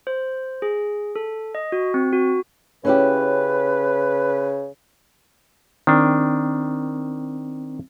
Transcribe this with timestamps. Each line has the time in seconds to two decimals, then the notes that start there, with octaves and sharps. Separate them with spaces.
0.07 C5
0.62 G#4
1.16 A4
1.55 D#5
1.72 F#4
1.94 C4
2.13 F#4
2.85 C#3 C#4 E4 G4 B4
5.87 D#3 C4 D4